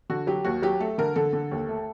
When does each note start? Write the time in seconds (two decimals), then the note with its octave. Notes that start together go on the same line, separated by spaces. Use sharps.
0.10 D3 F#4
0.27 F#3 G4
0.45 D#2 F#4
0.62 F#3 G4
0.80 A3 A4
0.98 D3 A#4
1.16 D3 A4
1.33 D3
1.51 D#2
1.69 A3